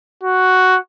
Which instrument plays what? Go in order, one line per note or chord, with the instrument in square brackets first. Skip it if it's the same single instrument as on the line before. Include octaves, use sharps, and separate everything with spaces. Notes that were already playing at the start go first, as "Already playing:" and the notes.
[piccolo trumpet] F#4